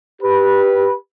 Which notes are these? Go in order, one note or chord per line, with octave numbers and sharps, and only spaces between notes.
G4 B4